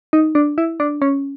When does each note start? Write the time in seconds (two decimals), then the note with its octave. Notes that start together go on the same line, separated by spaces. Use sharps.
0.13 D#4
0.35 D4
0.58 E4
0.80 D4
1.02 C#4